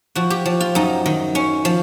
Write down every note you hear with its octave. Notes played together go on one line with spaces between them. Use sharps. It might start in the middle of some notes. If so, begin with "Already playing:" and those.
F3 F#4
G4
F3
F4
F#2 D#4
D#3
C#4
F3